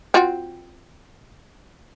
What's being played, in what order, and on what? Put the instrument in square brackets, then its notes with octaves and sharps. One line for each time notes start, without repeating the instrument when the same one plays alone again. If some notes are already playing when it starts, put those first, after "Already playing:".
[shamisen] C4 F4 F#4